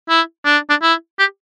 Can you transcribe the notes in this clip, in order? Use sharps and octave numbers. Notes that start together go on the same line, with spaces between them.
E4
D4
D4
E4
G4